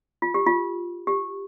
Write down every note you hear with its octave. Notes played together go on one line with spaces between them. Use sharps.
F4
G4
F4
G4